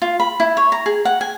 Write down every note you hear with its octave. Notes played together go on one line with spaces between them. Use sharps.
F4
B5
E4
C#5
A#5
G#4
F#5
G#5